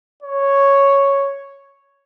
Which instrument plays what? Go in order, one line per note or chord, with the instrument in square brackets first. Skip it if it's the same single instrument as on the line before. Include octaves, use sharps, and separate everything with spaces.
[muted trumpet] C#5